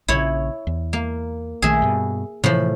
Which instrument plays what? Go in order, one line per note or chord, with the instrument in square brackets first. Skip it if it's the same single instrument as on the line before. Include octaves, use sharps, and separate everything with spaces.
[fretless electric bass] A#1 A#2 C#3 [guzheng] E4 C#5
[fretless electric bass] E2
[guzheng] A#3
[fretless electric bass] A#1 D#3 A3 [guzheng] G#4 E5
[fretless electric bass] G2 B2
[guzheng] A2 F3 [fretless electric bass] C3 E3 A3